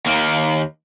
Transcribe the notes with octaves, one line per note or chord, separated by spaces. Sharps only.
D#2 A#3